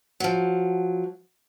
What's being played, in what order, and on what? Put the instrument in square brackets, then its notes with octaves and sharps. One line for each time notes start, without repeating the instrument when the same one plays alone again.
[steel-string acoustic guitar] F3 F#3